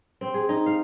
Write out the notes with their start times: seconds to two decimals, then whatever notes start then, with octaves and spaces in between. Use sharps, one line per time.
0.21 C4
0.34 G#4
0.49 D#4
0.66 F5